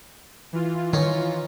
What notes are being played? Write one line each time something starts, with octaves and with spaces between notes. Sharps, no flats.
E3 F4
D#3 C#4 D#4 C#5